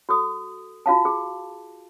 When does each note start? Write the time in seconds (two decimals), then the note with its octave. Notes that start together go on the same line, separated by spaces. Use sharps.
0.09 F#4 A4 D#6
0.86 F4 F#4 F5 A5
1.05 G#4